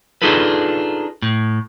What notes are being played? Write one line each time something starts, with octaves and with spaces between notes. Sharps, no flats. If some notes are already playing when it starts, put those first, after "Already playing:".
D4 D#4 F4 G#4 A4 B4
A2